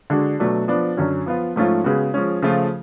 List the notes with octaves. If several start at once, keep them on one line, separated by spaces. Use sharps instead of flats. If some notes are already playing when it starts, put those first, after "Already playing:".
D3 G#3 D4 F#4
B2 F#3 A3 D4
F3 B3 D4
F#2 D3 F#3 C#4
F3 B3 F4
G#2 F3 A3 C#4 F4
C#3 G#3 B3 F#4
F3 G#3 C#4
C#3 F3 A3 F4